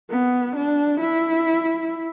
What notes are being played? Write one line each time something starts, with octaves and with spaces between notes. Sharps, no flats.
B3
D4
E4